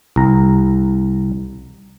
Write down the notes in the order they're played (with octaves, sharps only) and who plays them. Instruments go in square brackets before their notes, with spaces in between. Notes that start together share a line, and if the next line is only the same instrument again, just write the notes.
[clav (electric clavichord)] C2 A#5